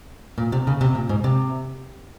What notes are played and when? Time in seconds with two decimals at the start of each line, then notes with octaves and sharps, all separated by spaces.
0.38 A#2
0.52 C3
0.67 C#3
0.81 C3
0.95 A#2
1.09 G#2
1.24 C3